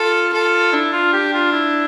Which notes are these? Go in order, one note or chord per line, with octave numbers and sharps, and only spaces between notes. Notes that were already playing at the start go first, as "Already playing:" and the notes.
Already playing: F4 A4
F4 A4
D4 E4
F4
G4
F4
E4